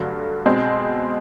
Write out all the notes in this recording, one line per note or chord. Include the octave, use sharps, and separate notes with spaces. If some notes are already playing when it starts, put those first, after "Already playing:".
Already playing: G2 D3 F#3 A3
B2 G#3 C4